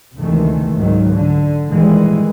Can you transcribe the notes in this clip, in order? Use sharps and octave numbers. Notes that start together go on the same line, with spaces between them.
D2 C3 D#3 E3 G#3 A3
C#2 G#2 D#3 F#3
D3
A#2 D#3 E3 G3 G#3